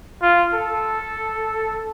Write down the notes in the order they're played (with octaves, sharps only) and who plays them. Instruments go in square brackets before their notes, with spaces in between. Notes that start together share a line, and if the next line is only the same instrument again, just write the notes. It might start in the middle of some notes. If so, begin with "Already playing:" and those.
[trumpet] F4
A4